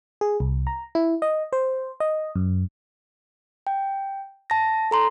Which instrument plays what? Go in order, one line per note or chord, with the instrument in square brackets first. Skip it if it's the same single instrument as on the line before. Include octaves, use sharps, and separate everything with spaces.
[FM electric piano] G#4
C2
A#5
E4
D#5
C5
D#5
F#2
[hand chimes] G5
A5 A#6
A4 A#5 C6